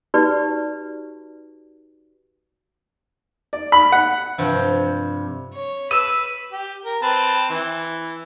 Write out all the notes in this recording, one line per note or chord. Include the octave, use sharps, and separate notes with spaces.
D#4 F#4 G4 B4 D5
D5
B5
F#5
G2 C3 F3 G5
C#5
B4 E6 D#7
G4
A#4
C4 B4 A5
E3